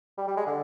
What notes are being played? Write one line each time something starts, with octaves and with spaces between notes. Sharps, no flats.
G3
G3
G#3
D3